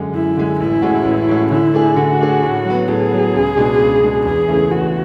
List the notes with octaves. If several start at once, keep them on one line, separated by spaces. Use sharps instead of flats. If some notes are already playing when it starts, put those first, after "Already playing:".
Already playing: F#2 D3 G#3
F#2 E4
D3 G#3
A1 E4
A2 G#3 C#4 F#4
A1
A2 G#3 C#4 F#4
D3 E4
A3 D4 G#4
D3 F#4
A3 D4 G#4
A2
F#3 B3
A2 G#4
F#3 B3
C#2
B2 G#3 D4
C#2
B2 G#3 D4
E2 G#4
C#3 E3 A3
E2 F#4